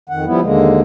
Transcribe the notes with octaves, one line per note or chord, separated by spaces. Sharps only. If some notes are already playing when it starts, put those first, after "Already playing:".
F2 D#3 F#5
F3 G3 B3 E4
D#2 D3 G#3 A#3